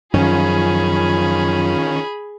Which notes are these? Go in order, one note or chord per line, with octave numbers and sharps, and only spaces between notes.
F#2 D#3 F3 C#4 F4 G#4 B5